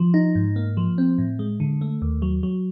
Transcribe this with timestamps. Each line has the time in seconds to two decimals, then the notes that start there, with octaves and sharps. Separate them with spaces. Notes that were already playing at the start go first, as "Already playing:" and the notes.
Already playing: F3
0.14 D#4
0.35 G#2
0.56 A#3
0.77 F3
0.98 C4
1.18 A2
1.39 G#3
1.60 D3
1.81 A3
2.02 D#2
2.22 F#3
2.43 F#3